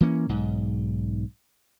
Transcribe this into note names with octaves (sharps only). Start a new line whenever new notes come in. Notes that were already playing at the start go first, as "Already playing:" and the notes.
E3 A#3 C#4
B1 G#2